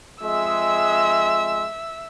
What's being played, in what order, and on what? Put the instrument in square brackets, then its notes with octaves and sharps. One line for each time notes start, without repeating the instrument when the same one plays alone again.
[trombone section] F2 G#3 [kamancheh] E5 E6